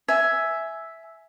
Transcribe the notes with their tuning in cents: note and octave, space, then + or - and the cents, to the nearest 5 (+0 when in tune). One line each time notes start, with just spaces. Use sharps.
E5 +0 G#5 +10